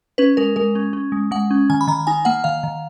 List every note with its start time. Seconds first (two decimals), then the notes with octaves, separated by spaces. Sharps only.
0.18 C#4 B4
0.37 G#3 A#4
0.56 G#3 A#4
0.75 C#4
0.93 C#4
1.12 G#3
1.31 G#3 F#5
1.51 C#4
1.70 D#3 G#5
1.81 B5
1.87 D#3 A#5
2.07 D#4 G#5
2.25 A#3 F#5
2.44 D#3 F5
2.63 D#3